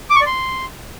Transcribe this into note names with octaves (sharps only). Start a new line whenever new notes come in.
D6
C#6
D5
C6